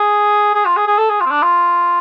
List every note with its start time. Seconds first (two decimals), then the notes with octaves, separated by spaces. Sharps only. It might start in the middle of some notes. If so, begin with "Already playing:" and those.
Already playing: G#4
0.55 G#4
0.65 F4
0.77 G#4
0.87 G#4
0.98 A4
1.10 G#4
1.21 F4
1.26 C4
1.31 D4
1.43 F4